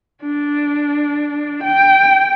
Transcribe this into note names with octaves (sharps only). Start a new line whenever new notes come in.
D4
G5